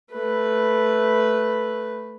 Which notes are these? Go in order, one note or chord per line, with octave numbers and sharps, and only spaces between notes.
A3 B4